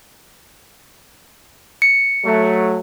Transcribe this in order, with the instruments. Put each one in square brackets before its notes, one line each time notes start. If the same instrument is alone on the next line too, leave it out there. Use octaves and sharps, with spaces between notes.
[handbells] C#7
[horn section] F#3 A3